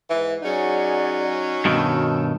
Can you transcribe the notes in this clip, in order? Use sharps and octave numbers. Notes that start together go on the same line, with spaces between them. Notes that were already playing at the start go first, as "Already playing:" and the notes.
G#2 E3
F#3 C#4 D#4 G#4 D5 F#5
G2 B2 D#3 A5 E6